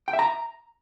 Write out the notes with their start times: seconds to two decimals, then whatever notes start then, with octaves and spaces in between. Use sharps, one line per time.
0.08 G5
0.13 E5
0.19 A#5